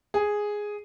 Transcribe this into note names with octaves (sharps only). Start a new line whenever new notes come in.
G#4